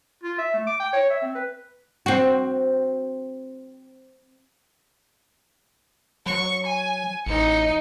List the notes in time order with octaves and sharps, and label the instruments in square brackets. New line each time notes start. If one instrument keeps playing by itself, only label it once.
[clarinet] F4
E5
A3
D6
G5
C#5
E5
C4
B4
[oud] C4 F#4
[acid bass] F#3 [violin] C#6
[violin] G#5
[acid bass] A1 [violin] D#4 C#7